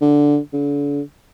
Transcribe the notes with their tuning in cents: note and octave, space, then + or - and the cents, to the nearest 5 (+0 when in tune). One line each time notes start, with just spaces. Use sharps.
D3 -5
D3 -40